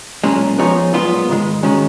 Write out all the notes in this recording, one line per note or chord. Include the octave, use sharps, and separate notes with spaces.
B1 A#2 G#3 C#4
F3 B3 D#4 G#4 C#5
B1 A#2 G#3 B3 F4
G#2 D#3 G#3
D#3 G#3 C#4 F#4